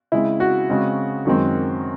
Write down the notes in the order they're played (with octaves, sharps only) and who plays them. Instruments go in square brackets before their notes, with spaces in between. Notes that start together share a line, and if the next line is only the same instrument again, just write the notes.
[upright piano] C#3 G#3 C4 E4
F#4
C#3 G#3 C4
F#2 D#3 G#3 C4